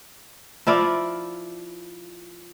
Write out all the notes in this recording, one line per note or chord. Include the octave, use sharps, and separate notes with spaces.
F3 E4 F4 D5